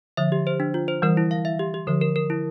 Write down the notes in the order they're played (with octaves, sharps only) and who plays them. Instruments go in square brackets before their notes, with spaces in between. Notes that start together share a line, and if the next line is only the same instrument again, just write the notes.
[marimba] D3 F3 [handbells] E5
[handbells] G4
C5
D4
F4
C5
[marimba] E3 G3 [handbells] A#4
[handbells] E4
F5
E5
G4
G4
[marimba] D3 F3 [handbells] A#4
[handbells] A#4
A#4
E4